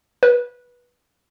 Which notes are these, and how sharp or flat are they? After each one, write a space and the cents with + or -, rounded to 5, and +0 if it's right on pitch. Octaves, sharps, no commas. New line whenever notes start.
B4 -15